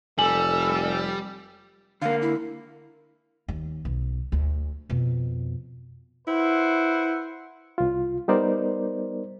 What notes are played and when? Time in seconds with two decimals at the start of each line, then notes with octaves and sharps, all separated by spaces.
0.18 F1 G3 A4 G#5 E6 F#7
2.02 D3 A#3 F5
2.22 E4
3.48 D#2
3.85 B1
4.32 D2
4.89 F2 B2
6.27 E4 B4 C5 F#5
7.78 C2 F4
8.28 G3 B3 D#4 A#4 C5 D5